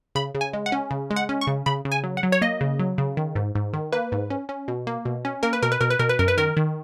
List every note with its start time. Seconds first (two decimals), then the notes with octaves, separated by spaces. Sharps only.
0.15 C#3 B5
0.35 C#3
0.41 G#5
0.54 G#3
0.66 F#5
0.72 C#4
0.91 C#3
1.11 G#3
1.16 F#5
1.29 C#4
1.41 C#6
1.47 C#3
1.66 C#3 B5
1.85 C#3
1.92 G#5
2.04 F#3
2.17 F#5
2.23 F#3
2.32 C#5
2.42 A#3 D#5
2.61 C#3
2.79 F#3
2.98 C#3
3.17 D#3
3.35 G#2
3.55 G#2
3.73 D#3
3.92 A#3 B4
4.12 G#2
4.30 C#4
4.49 C#4
4.68 B2
4.87 A#3
5.05 B2
5.25 C#4
5.43 A#3 A#4
5.53 B4
5.62 B2 A#4
5.72 B4
5.81 B2 A#4
5.90 B4
5.99 B2 A#4
6.09 B4
6.19 F#2 A#4
6.28 B4
6.37 D#3 A#4
6.57 D#3